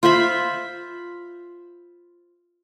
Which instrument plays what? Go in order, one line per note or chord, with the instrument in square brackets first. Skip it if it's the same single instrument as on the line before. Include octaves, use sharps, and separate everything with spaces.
[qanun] F4 C5 E5 B5